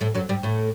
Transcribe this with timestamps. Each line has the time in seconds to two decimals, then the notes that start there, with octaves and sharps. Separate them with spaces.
0.01 A2 A3
0.15 F#2 F#3
0.29 G2 G3
0.43 A2 A3